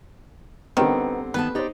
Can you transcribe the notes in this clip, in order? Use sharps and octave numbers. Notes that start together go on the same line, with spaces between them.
D3 D#3 G3 B3 C4
D#3 B3 B4 A5
D#4 G4 C5 D5